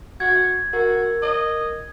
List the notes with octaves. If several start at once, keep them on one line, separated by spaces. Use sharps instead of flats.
F#4 G#6
F#4 A#4
D#5